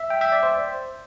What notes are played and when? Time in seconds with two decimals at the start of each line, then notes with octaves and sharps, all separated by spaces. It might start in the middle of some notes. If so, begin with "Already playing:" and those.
Already playing: E5
0.10 G5
0.21 E5
0.32 D5
0.43 C5